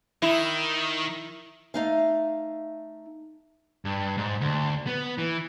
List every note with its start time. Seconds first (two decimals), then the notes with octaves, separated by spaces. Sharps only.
0.22 D#3 E4
1.74 A3 D#4 F5
3.85 G2
4.18 G#2
4.41 D2
4.87 B3
5.18 E3